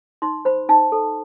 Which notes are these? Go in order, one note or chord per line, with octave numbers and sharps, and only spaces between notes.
D#4 C6
C5 B5
D#4 A5
A4